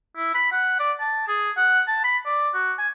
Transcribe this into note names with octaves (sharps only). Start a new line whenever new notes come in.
E4
B5
F#5
D5
A5
G#4
F#5
A5
B5
D5
F#4
G#5